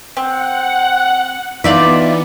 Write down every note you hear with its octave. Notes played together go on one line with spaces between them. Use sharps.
C4 F#5
E3 B3 D#4 F4 D5 E5